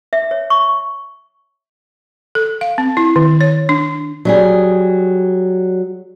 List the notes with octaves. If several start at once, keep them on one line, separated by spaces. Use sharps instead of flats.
E5
C#5
C#6
A4
F5
C4
E4
D#3
C#5
D4
F#3 G3 G#4